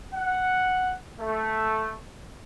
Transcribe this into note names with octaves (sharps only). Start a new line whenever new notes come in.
F#5
A3